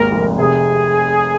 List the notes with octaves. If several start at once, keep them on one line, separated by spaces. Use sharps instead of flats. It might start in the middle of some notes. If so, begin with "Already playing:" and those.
Already playing: G#1 D#2 G#2 A#4
F1
C3 G#4